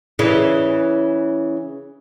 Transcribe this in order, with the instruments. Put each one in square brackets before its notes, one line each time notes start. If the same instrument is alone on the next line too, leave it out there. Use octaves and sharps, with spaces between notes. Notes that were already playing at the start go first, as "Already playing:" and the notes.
[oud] C#3 E3